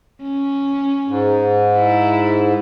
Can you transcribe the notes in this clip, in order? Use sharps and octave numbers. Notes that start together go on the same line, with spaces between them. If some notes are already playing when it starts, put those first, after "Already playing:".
C#4
G#2
E4